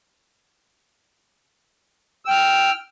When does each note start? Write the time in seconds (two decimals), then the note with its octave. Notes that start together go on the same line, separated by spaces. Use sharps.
2.25 E6
2.28 G5
2.30 F6